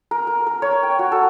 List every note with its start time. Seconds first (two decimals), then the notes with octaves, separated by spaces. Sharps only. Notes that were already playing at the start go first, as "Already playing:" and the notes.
0.11 A#4
0.27 A#4
0.47 A#4
0.62 C#5
0.83 G5
0.99 F#4
1.12 A4